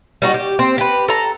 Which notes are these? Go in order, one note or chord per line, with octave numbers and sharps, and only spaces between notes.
G3 D#4 F#4
G4
C4
G4 B4
A4 A#5